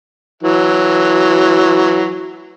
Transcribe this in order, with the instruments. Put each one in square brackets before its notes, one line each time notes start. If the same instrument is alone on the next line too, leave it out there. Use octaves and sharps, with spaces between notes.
[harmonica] E3 F#3